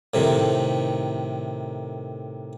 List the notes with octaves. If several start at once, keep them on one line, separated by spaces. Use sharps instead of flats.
A2 C3 D#3